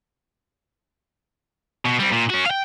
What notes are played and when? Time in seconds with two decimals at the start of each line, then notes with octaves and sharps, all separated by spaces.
1.86 B2
2.00 G3 C4
2.13 A#2
2.30 C#4 F#4
2.46 F5 G5